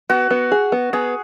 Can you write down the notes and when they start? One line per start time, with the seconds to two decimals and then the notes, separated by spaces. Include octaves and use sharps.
0.09 B3 F#4
0.30 B3
0.52 G#4
0.72 B3
0.93 B3 G#4